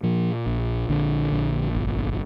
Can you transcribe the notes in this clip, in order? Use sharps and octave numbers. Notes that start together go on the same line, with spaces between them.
A#2 F3
A#1
A#1 D3
A#1
G1